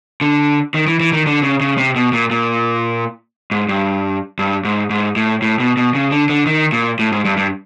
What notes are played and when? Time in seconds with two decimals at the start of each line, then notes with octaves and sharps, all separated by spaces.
0.21 D3
0.74 D#3
0.87 E3
1.00 E3
1.13 D#3
1.26 D3
1.43 C#3
1.61 C#3
1.78 C3
1.96 B2
2.13 A#2
2.31 A#2
3.51 G#2
3.69 G2
4.39 G2
4.65 G#2
4.90 G#2
5.16 A2
5.42 A2
5.60 B2
5.77 B2
5.95 C#3
6.11 D3
6.29 D3
6.46 D#3
6.72 A#2
6.99 A2
7.12 G#2
7.25 G2
7.37 G2